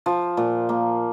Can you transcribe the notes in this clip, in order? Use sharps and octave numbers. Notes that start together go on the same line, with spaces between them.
F3
A#2
A#3